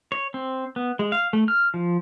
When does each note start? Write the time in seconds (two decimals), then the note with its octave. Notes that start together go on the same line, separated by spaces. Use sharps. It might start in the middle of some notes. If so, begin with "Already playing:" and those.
0.12 C#5
0.34 C4
0.76 B3
0.99 G#3
1.12 F5
1.33 A3
1.48 F6
1.74 F3